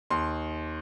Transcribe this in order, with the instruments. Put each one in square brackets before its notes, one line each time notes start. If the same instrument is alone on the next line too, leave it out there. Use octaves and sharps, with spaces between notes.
[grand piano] D#2 C6